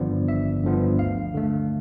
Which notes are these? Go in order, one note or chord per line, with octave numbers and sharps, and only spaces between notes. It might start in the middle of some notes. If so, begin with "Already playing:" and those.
Already playing: G1 G2 D3 F3 B3 D5
G1 E5
G2 D3 F3 B3
D2 F5
D3 A3